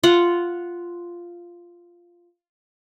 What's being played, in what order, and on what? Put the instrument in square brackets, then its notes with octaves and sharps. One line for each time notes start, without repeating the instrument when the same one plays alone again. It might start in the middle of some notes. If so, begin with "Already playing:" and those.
[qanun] F4 F#5